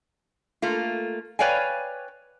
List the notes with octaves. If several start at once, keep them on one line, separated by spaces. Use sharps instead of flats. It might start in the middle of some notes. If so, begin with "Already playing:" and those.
A3 A#3 F4
B4 C#5 D5 F5 G5 G#5